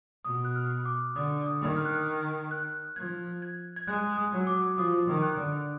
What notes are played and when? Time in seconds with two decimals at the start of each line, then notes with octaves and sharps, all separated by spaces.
0.25 B2 D#6
0.45 F#6
0.56 F6
0.86 D6
1.15 D3 D#6
1.46 D#6
1.61 D#3
1.76 F6
1.85 F#6
1.94 F6
2.06 F6
2.51 F#6
2.96 F3 G#6
3.42 G#6
3.76 G#6
3.87 G#3 F#6
4.18 D#6
4.32 F#3
4.47 D6
4.77 F3 D#6
5.08 D#3
5.22 F#6
5.38 D3